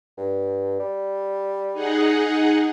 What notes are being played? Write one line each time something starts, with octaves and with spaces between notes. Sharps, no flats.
G2
G3
D#4 G#4 F#5